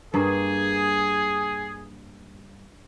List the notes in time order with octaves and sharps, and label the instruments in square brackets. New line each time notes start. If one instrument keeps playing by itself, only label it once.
[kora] G2 A#3 [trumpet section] G#4